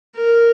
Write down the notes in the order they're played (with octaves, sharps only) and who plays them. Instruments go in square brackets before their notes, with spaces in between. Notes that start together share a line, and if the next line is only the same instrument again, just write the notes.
[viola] A#4